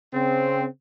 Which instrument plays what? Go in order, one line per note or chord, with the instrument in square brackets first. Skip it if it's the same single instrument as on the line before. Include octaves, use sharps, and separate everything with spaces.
[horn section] C#3 C4